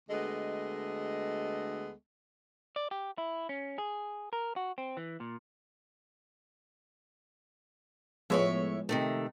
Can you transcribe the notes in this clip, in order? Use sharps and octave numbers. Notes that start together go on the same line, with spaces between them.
D2 G#3 B3 A4 D#5
D5
G4
E4
C#4
G#4
A#4
F#4
C4
E3
A#2
A2 F3 G#3 B3 C#5 E5
C3 D#3 A3